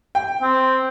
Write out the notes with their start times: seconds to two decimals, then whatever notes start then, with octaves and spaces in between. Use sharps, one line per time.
0.15 G5
0.42 C4